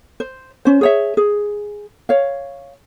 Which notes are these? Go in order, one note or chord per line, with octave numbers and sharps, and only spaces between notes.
C5
C#4 C5
G#4 C#5 E5
G#4
C#5 F5